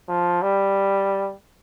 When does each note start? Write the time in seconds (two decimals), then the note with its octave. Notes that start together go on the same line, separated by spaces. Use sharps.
0.09 F3
0.42 G3